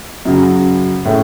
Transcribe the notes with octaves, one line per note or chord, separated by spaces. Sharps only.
F#2 C#3 F#3
A2 G#3 C#4 G#4